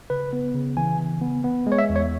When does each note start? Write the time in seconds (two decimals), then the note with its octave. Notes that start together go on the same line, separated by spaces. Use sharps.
0.10 C#3 B4
0.33 B3
0.55 C#3
0.77 E3 G#5
0.99 C#3
1.22 B3
1.44 B3
1.67 G#3
1.72 C#5
1.78 E5
1.90 E2
1.96 C#5